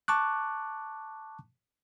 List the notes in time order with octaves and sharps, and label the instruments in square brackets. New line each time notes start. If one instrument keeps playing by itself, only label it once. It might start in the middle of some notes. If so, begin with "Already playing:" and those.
[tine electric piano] A5 C#6 D6 F#6